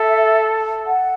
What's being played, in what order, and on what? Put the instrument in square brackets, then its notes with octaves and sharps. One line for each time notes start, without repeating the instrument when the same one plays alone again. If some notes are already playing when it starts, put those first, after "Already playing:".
Already playing: [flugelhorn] A4 [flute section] E5
[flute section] F#5